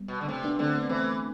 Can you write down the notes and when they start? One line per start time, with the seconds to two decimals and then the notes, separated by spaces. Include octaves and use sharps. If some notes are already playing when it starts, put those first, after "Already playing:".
Already playing: G3 B3
0.08 B2
0.21 D3
0.28 C3 A3 C4
0.44 B3 D4
0.59 D3 A3 C4
0.78 B3
0.89 E3 A3 C4